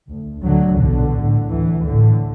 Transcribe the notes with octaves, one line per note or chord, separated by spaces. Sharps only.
D2
D2 D3 F#3
B1 B2 D3
A1 A2
D2 E3
A1 A2 D3